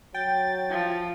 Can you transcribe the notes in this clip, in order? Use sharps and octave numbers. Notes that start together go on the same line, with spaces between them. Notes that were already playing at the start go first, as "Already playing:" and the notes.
F#3 G5 A6
F3